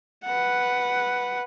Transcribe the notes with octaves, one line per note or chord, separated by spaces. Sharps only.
B4 F#5